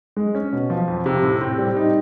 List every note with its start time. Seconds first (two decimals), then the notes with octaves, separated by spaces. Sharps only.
0.17 G#3
0.35 C#4
0.53 B2
0.70 F3
0.88 F2
1.06 C3
1.23 A2
1.41 C4
1.58 G3
1.76 D#4